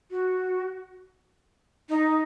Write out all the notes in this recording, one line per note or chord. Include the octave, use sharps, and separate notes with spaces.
F#4
D#4